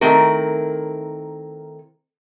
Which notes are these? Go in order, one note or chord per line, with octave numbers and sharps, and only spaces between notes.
D#3 A3 C4 E4 A#4